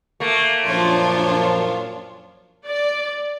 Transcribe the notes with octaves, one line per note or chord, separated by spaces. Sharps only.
A3 A#3
F#2 A#2 F3 D4 F4 C#5
D5